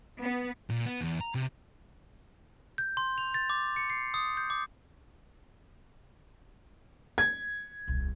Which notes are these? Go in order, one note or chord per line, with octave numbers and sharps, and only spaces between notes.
B3
A#2
B3
E2
A#5
C3
G6
C6
F7
A6
D6
C#7
C7
D#6
G6
D6
G#6
D#1 C2